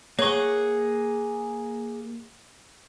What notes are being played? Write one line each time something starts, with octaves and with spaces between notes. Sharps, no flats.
A#3 G#4 C#5 F#5 C#6